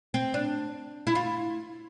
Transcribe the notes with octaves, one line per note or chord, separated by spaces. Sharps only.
C4
D4
E4
F4